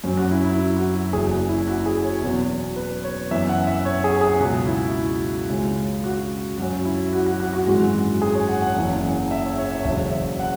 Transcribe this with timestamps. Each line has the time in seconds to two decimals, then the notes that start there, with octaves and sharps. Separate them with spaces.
0.04 F#2 F#3 C#4
0.17 F#4
0.31 E4
0.44 E4
0.58 E4
0.77 F#4
0.95 F#4
1.13 F#1 E2 E3 G#4
1.31 F#4
1.49 E4
1.68 F#4
1.86 G#4
2.03 C#5
2.22 E2 B2 F#3 B3
2.76 B4
3.04 C#5
3.31 F#2 E3 B3 E5
3.49 F#5
3.67 E5
3.85 C#5
4.04 G#4
4.21 G#4
4.39 C#2 B2 F#3 F#4
4.67 E4
5.49 C#2 C#3 G#3 C#4
6.04 F#4
6.58 F#2 F#3 C#4 F#4
6.85 E4
7.13 F#4
7.26 F#4
7.40 F#4
7.53 F#4
7.67 G#1 F#2 E3 G#3 F#4
8.22 G#4
8.34 C#5
8.49 F#5
8.62 F#5
8.76 F#1 E2 C#3 E3
9.31 E5
9.44 C#5
9.58 C#5
9.71 E5
9.84 E1 E2 C#3 F#3 E5
10.40 F#5